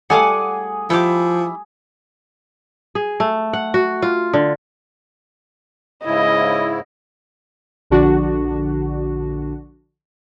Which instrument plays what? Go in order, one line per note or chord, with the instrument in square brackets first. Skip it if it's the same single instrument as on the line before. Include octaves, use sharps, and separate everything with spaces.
[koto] G3 A3 F5 [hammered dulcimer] G#4 [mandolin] F#5 G#5 D6
[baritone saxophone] F3 [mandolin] E4 D6 [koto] G4 G5
[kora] G#4
A3
F#5
F#4
F4
D3
[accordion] G#2 C#3 E4 [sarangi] D#5
[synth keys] A#1 D3 D4 F#4